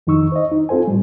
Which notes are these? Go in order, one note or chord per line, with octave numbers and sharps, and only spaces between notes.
F2 D#3 D#4 C#6 E6
C5 D#5
D#4
C4 F4 A4 C5 G#5
A2 G3